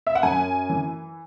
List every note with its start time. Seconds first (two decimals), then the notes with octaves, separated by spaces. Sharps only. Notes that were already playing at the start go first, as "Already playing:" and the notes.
0.07 E5
0.15 F#5
0.23 F#2 G#5
0.69 E3